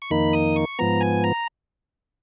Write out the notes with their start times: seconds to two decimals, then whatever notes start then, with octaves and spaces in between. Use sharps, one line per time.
0.02 C#6
0.10 F2 D#3 A#3 D#4 B5
0.33 D#6
0.56 C#6
0.79 G#2 F3 B3 A#5
1.01 G#5
1.24 A#5